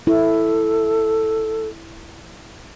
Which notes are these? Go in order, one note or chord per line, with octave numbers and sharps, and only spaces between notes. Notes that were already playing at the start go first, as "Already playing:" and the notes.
E4 A4